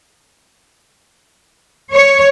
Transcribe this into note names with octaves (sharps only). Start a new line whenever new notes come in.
C#5